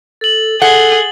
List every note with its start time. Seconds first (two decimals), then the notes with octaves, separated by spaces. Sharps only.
0.21 A4 A6 F#7
0.62 G#4 A4 F#5 G7